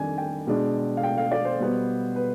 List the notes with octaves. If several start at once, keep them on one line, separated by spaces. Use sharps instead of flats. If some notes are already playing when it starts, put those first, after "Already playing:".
Already playing: F2 D#3 G3 D4 G#5
G5
B2 G#3 D4
F5
G5
F5
D5
C5
B2 G3 B3
B4